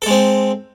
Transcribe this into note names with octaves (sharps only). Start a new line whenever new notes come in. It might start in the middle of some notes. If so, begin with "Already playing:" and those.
G#3 C4 A4